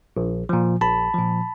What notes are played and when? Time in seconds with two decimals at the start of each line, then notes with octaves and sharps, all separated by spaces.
0.17 A#1
0.49 A#2 F3
0.81 A#1 A5 B5
1.14 A#2 F3